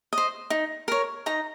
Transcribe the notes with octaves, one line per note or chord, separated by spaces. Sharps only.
D#5
C5
D#4
A#4 C#5
D#4 A#5